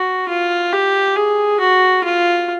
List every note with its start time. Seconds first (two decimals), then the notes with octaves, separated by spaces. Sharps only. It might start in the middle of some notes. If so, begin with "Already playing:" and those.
Already playing: F#4
0.28 F4
0.73 G4
1.16 G#4
1.60 F#4
2.04 F4